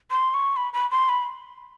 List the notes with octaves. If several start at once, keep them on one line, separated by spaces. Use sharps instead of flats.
C6
C#6
B5
B5
C6
B5